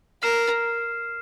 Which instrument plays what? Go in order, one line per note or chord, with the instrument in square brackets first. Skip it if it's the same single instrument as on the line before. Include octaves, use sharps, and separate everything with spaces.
[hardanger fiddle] A#4 [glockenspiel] F6 C7 E7